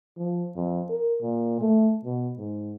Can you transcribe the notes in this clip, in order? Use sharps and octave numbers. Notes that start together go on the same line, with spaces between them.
F3
F2
A#4
A#2
A3
B2
G#2